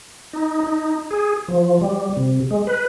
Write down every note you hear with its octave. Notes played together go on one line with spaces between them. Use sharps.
D#4
D#4
G#4
F3
G3
C3
G#3
B4